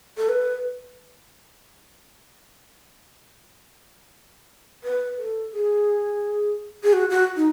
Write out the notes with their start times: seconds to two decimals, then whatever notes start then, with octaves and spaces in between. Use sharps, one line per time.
0.18 A4
0.29 B4
4.84 B4
5.18 A4
5.53 G#4
6.84 G#4
6.93 F#4
7.10 F#4
7.36 D#4